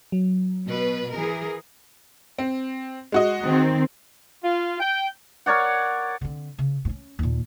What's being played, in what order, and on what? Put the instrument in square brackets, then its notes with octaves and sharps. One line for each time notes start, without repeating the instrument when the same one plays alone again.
[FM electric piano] F#3
[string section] B2 B4
E3 G#4 A#4
[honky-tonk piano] C4
G#3 F#4 D#5
[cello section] D#3 C4
[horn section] F4
G5
[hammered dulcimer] A#4 C#5 D5 F#5
[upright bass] D3 C4
C#3
G2 C#4
D#2 A#2